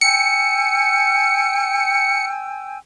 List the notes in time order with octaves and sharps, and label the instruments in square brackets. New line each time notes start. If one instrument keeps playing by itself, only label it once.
[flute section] G5 G#5 E6 [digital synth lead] C#7